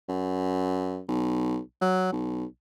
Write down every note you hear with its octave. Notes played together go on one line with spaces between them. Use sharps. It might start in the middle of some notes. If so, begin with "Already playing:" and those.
F#2
B1
F#3
B1